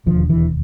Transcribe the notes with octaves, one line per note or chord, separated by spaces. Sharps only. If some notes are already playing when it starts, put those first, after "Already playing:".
E1 D#2 D3 F3
E3